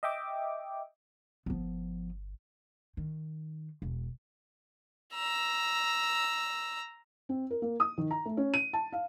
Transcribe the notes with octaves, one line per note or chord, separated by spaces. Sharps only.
D#5 E5 G5 D6
G1 F3 B3
D#3
E1
A#5 E6
C4
A#4
A#3
D#6
D#3
A#5
A3
C#4
D#7
A5
F5